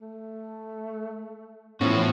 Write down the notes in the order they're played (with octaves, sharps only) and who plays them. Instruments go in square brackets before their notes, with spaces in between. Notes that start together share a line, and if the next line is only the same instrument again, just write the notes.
[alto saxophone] A3
[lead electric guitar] A2 [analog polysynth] E3 B3 C#4 [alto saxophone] F3 [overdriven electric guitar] F#4